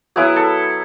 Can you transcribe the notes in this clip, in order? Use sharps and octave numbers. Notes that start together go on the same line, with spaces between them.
F#3 B3 E4 G#4
A4